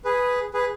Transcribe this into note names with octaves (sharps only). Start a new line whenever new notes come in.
G#4 B4
G#4 B4